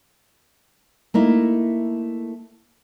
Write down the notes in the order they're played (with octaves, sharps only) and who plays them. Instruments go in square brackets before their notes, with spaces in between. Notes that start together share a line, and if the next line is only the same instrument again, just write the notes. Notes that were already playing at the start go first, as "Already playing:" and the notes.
[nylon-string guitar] A3 A#3 D#4 E4